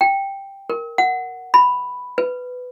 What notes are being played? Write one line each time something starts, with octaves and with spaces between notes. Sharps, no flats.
G5
A#4
F#5
B5
B4